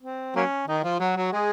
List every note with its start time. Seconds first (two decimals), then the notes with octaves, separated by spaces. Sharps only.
0.02 C4
0.36 F#3 A#3 C#4
0.68 D#3 D#4
0.83 F3 F4
1.00 F#3 F#4
1.16 F#3 F#4
1.33 G#3 G#4